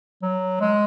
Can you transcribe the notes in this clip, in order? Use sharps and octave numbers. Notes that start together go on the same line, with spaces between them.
F#3
G#3